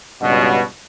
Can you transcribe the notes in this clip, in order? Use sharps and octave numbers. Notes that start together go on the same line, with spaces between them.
C#2 G2 B2